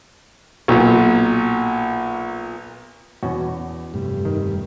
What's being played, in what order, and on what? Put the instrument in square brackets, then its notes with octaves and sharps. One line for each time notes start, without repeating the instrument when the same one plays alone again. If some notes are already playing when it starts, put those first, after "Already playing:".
[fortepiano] B1 A#2
[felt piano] E2 [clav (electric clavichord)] B2 C#4 F#4
[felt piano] F1 [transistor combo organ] G2
[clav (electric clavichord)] D#3